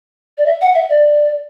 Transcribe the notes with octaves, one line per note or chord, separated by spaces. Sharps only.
D5
E5
F#5
E5
D5